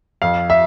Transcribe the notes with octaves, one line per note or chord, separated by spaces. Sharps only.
F2 F5
E5